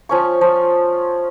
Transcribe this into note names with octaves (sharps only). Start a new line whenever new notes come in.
F3 C#4 C#6
F3